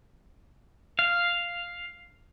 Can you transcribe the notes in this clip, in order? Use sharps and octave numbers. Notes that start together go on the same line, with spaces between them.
F5